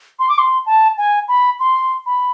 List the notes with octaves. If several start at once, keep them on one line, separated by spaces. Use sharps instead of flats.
C6
D6
C6
A5
G#5
B5
C6
B5